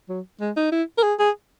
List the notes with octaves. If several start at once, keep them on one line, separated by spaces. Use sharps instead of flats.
F#3
G#3
D#4
E4
A#4
G#4
G#4